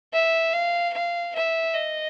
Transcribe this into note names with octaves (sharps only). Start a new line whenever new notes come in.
E5
F5
F5
E5
D#5